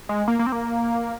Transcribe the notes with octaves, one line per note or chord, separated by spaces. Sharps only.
G#3
A#3
A#3
C4
A#3